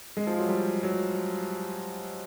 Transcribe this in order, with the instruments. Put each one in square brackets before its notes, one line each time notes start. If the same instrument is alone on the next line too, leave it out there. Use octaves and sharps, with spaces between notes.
[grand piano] G#3
F3
F#3
G3
F#3